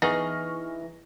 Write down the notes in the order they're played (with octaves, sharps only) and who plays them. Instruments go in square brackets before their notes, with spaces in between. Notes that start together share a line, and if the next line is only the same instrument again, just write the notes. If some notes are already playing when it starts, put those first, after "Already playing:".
[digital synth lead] E3 [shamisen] B3 [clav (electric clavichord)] D#4 G#4 [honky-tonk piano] C#6 F6 A#6